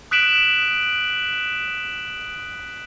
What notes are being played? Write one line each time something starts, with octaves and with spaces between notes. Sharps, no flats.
D#6 F#6 B6 D7 E7 F#7